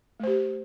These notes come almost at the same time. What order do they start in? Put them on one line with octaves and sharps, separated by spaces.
A3 C5 G4